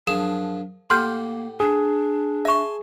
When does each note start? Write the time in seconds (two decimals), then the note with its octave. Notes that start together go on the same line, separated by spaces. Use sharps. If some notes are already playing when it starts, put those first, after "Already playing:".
0.07 F#2 F3 D4 G#4 E7
0.90 A2 A#3 G4 F#5 C6 F6 G6
1.60 D4 G#4
2.45 E5 G#5 A5 C6 C#6